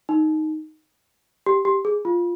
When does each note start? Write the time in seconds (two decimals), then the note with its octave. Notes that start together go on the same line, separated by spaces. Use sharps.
0.09 D#4
1.46 G4
1.65 G4
1.85 G#4
2.05 F4